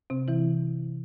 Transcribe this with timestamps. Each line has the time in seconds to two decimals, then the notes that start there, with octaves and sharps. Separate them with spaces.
0.10 C3 C4
0.28 E3 E4